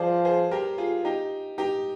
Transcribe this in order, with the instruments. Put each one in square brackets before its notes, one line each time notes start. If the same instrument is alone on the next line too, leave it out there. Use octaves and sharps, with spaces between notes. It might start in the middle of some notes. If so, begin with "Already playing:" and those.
Already playing: [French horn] F3 [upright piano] G#4 C5 D5
[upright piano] G#4 C5
G4 A#4
F4 G#4
D#4 G4
D#4 G4